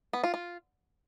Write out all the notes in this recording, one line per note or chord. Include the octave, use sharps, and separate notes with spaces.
B3
F4
F4